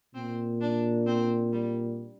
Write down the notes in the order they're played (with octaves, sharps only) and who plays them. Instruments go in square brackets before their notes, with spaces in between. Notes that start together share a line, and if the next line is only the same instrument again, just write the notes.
[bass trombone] A#2 [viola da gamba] C4
[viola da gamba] D4
C4
G3